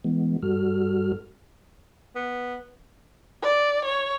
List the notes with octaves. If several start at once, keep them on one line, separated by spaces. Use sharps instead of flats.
E3 G#3 B3
G2 G3 F#4 A4 F6
B3
D5
C#5